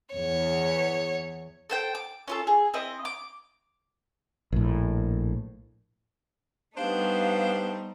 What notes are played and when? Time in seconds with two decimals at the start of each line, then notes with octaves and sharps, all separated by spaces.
0.14 E2 C#5
1.70 A4 C5 G5
1.95 D6
2.28 C#4 F4 A4
2.47 G#4
2.74 C4 E4 D#5
3.05 D6
4.52 A#1 A2
6.77 G3 A3 B3 D4 D#4 G4 C5 F5